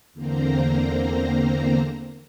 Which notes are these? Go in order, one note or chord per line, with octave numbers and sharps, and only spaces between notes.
E2 D3 A#3 C4 C5 A#5